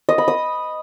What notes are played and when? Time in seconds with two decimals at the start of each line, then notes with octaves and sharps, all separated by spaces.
0.09 D#5
0.18 B5
0.28 D#6